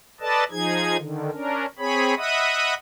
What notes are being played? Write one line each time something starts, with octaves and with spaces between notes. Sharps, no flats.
A4 B4 D5 D#5 A5
F3 D#4 G#4 G#6
D3 D#3
C#4 D4 A#4
C4 G#4 C#5 B5
D#5 E5 F#5 B5 D#6